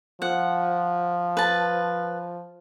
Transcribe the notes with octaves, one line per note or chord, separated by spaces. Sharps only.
F3 F#5
B4 A5